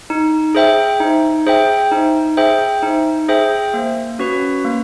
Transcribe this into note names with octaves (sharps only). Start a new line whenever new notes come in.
D#4
G#4 C5 E5 G5
D#4
G#4 C5 E5 G5
D#4
G#4 C5 E5 G5
D#4
G#4 C5 E5 G5
A#3
C#4 F#4 B4
A#3